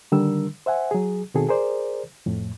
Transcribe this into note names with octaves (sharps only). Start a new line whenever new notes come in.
D3 D#3 G3 D4 A#4 E6
C5 E5 F#5 G#5
F#3 G#4
B2 D#3 C4 F#4 G#4 A4
G#4 A#4 C5 D5
F2 A2